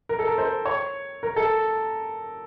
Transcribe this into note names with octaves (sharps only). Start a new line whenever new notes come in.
A#4
A4
A#4
C5
C#5
A#4
A4